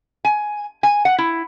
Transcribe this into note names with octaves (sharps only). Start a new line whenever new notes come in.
G#5
G#5
F#5
E4